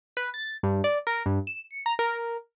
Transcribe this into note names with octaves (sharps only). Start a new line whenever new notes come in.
B4
A6
G2
D5
A#4
G2
E7
C#7
A#5
A#4